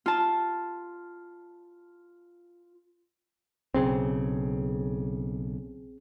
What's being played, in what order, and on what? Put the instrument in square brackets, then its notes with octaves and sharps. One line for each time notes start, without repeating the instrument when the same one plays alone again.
[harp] F4 A5
[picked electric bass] B1 C#3 [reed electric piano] C4 G#4